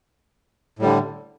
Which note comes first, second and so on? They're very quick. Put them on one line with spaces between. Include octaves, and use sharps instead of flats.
A2 G3 D3